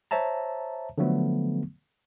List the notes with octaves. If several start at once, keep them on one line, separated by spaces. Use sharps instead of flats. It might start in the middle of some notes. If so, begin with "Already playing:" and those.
C5 C#5 E5 A5 A#5
D3 F3 F#3 A3 B3